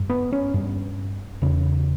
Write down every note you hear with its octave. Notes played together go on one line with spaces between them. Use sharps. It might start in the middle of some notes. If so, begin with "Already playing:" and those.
Already playing: G2
B3
C#4
G2
E2 C#3